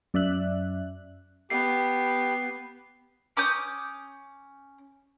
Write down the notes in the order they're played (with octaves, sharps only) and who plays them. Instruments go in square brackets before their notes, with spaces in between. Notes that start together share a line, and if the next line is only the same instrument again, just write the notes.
[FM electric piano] F#2 D5 E5 F#6
[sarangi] B3 [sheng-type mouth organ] G4 [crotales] C7
[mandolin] C#4 D6 D#6 G6